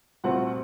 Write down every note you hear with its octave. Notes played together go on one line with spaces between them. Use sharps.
C2 A#2 A3 C4 F#4 F#5